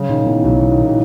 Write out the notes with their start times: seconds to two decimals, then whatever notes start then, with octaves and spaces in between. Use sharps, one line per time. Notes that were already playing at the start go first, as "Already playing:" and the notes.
Already playing: C#3 F#3
0.09 A#2 D#3
0.26 E3 B3
0.44 B1 F#3
0.58 E3 F#3
0.71 D#3
0.80 A#2 E3